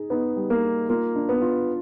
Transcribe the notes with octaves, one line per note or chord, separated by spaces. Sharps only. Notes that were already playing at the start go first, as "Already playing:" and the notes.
Already playing: D#4 G#4
B3 D#4
G3
A#3
D#4
A#3 F4
D4
B3
F4